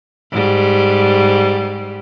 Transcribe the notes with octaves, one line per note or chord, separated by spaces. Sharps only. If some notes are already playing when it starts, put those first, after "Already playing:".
G#2 G3